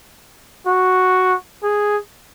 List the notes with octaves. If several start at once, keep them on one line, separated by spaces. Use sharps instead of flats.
F#4
G#4